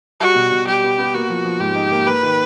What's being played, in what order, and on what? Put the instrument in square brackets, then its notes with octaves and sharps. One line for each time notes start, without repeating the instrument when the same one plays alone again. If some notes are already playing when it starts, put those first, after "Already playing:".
[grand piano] G3 [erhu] F#4
[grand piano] B2
B2
[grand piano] G3 [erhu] G4
[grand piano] B3
B3
[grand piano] A#3 [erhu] F#4
[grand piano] F3
F3
[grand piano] G#2 [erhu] G4
[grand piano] D#4
A#3
[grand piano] A#3 [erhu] B4
[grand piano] D#3